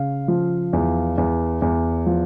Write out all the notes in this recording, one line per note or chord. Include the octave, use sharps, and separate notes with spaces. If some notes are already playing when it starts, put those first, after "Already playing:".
Already playing: C#3 F5
F3
E2
E2
E2
F3